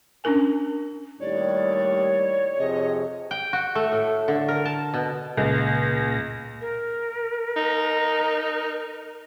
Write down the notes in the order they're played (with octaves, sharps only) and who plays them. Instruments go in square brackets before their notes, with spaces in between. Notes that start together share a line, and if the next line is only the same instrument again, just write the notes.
[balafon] C#4 D4 E4 A#4 G#5
[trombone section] D#2 A2 G3 [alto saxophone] C#5 [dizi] D5
[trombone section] F2 C3 G#4 [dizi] D#5
[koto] G5
F#4
A3
A2
D3
A#4
A5
B2
[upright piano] C#2 [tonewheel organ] A#2 A#6
[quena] A#4
[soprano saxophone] D#4